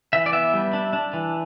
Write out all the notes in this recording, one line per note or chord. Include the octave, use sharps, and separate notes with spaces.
E3 E5
D5
B3 E5
G3
D4
D4
E3